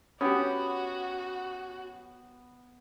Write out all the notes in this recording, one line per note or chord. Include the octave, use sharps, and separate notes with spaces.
B3 C#4 F#4 G4 G5